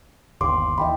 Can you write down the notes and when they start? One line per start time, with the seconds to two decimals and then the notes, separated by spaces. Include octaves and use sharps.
0.41 G1 D#2 C6 D6
0.78 D#2 E3 D#5 G5 B5